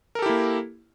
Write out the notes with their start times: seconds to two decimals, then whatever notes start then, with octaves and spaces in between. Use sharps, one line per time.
0.15 A#4
0.19 A4
0.22 G4
0.26 E4
0.29 A#3